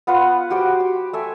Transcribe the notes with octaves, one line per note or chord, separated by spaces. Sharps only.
B3 F4 B4 F#5
F#4 G4 C5 G5
G4
A3 E5 G#5